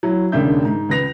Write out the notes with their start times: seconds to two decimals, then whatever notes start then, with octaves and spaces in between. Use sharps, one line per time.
0.03 F#3 E4
0.32 E1 D#2 C#3 D4 E5 G6
0.65 G#2
0.89 C#2 B4 A#6 F7